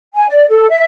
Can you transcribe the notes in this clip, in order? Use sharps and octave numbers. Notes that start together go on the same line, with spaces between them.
G#5
D5
A4
E5